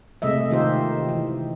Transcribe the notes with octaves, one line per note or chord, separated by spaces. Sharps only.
C3 G#3 A3 D#5 E5
D#3 D#4 F4 G4 C5
E3